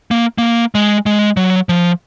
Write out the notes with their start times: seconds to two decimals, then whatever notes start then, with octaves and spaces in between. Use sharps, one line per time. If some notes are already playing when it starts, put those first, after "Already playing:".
0.11 A#3
0.38 A#3
0.75 G#3
1.06 G#3
1.37 F#3
1.69 F3